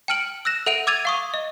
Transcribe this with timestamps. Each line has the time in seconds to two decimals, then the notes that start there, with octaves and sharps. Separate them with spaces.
0.08 G5 A5 F6 D7 F#7
0.45 E6 F#6 A#6 E7
0.66 A4 E5 F#5 D7 D#7 F7
0.87 D6 E6 G#6 A6 D#7 F7
1.05 F5 C#6 D#6
1.34 D#5